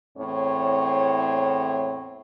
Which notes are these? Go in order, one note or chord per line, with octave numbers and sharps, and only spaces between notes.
E2 A2 C4 C#5